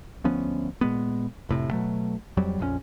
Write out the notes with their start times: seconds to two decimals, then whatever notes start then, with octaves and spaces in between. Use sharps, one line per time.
0.24 D2 F3 B3 C#4
0.81 A#2 G#3 B3
1.49 F1 A2 C3
1.71 B2 F#3 A3
2.37 F2 F#3 G3
2.59 A#1 F2 D3 C#4